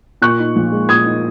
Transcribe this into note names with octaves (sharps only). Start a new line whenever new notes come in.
A#2 C#6 F#6
D#4
A#1
G#3
A#2 D#6 G#6
D#4